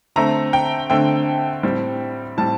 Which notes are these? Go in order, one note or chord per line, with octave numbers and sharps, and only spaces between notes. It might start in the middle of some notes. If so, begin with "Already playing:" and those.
D3 A3 C4 A#5
G5
D3 A3 C4 G5
A2 G3 C4
A2 G3 C4 A5